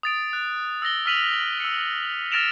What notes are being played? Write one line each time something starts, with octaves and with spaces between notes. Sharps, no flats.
D#6 A6 D7
F#6
E6 A6 A#6 G7
E6 F6 B6 D#7 F7 F#7
E6 C#7
F6 A6 A#6 D7 E7 F7